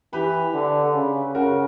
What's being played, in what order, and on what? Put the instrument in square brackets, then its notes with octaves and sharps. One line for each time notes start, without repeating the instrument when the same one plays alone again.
[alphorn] E3 [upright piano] G4 B4
[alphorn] D3
C#3
[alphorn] C#3 [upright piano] F#4 A#4